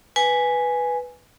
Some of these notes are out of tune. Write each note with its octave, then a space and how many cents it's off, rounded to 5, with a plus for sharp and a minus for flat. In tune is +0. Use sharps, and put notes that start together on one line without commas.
B4 +0 G#5 +0